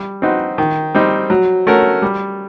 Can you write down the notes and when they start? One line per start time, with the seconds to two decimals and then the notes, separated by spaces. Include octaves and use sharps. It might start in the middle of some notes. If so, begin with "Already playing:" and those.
Already playing: G3
0.22 C4 D#4 F#4 B4
0.58 D#3
0.94 G3 C4 D#4
1.30 F#3
1.67 A3 C#4 F#4 A#4
2.02 G3